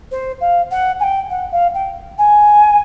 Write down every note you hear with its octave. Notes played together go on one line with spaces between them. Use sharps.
C5
F5
F#5
G#5
G5
F#5
F5
G5
G#5